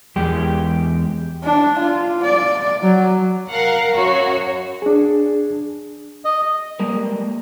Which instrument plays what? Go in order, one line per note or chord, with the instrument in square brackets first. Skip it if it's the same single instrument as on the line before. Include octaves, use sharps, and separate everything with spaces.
[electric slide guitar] E2 G#3 G4
[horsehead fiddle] D4
F4
D5
F#3
[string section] A#4 F5 F#5
F#2 F#4 C#5
[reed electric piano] D4 G#4
[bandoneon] D#5
[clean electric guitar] G3 G#3 A#3 A#4